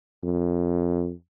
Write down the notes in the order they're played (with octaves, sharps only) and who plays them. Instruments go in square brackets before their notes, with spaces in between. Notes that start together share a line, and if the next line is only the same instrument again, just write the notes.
[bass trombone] F2